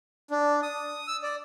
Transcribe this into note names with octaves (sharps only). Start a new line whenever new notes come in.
D4
D#6
E6
D5